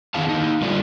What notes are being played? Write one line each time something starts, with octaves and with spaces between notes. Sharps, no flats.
D#3 B3 E4 G#4 F5 A5
A#3 D#4
D3 G3 F4 D5